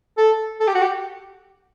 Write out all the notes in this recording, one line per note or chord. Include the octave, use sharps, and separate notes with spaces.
A4
A4
G4
F#4
G4